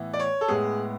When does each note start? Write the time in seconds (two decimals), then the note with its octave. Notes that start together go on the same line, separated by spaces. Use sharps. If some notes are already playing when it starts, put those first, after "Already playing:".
Already playing: A2 E3 B3
0.14 D5
0.19 C#5
0.41 A4
0.48 A2 G#3 B3 G#4